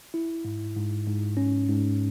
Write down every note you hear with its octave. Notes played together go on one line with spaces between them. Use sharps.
E4
G#2
G#2
G#2
C#4
G#2